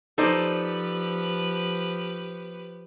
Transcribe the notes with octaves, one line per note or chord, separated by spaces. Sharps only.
F3 D#4 G4 A4 B4 C5 D5